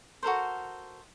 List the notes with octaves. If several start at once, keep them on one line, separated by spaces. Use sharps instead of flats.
F#4 A4 A#4 C5